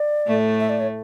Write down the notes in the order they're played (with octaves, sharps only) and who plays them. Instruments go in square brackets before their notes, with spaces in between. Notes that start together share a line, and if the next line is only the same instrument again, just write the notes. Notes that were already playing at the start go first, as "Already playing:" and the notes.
Already playing: [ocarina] D5
[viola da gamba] A2 A3
[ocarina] E5
D5
C#5